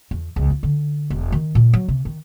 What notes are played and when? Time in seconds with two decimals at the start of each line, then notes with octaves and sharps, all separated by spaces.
0.11 E2
0.36 C#2
0.50 F4
0.63 D3
1.10 E1
1.32 D#3
1.55 A#2
1.73 F#3
1.88 C3
2.05 D#3